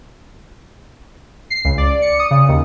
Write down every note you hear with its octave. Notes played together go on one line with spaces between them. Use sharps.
C7
C#2
D5
C#7
D#6
C#3
D#2